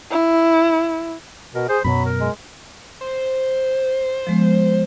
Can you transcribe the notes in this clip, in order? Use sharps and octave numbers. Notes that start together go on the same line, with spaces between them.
E4
B2 A#4
G#4 C5
F#2 B2 F#3 B5
A#4
G#3
C5
F3 G#3 B3